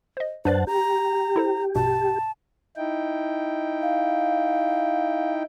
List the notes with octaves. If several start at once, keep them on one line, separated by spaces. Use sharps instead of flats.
C5 D#5
F#2 D4 B4 C5 D5 F#5 A5
G4 A#5
E4 A4 C5
A#1 G2 B2 A5
D#4 E4 G5
F5